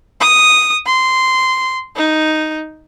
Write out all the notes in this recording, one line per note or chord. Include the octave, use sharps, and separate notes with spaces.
D#6
C6
D#4